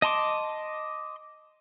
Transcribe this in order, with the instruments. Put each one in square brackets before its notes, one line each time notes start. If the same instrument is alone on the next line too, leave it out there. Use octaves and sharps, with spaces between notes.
[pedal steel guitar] D#5 A5 C6 D6